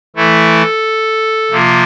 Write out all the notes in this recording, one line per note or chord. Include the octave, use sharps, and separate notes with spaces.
E3 A3 E4 A4
C3 F3 A#3 F4